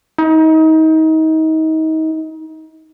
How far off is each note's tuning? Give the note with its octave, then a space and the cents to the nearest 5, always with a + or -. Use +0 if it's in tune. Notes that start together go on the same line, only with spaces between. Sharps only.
D#4 +30